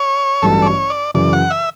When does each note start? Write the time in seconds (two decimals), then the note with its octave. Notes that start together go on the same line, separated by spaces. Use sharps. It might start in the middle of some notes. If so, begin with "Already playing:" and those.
Already playing: C#5
0.42 A1 G2 F#3 A4
0.62 D5
0.66 C#5
0.90 D5
1.14 F#2 C#3 E3 D5
1.33 F#5
1.51 E5